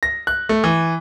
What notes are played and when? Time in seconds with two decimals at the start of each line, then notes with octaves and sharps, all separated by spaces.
0.03 A#6
0.27 F#6
0.49 A3
0.64 E3